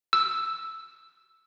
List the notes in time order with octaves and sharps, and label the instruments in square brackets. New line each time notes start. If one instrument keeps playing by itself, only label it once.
[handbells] E6